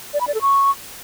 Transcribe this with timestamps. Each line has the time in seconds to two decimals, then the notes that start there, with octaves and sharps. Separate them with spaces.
0.14 D5
0.21 B5
0.28 D5
0.34 A4
0.41 C#6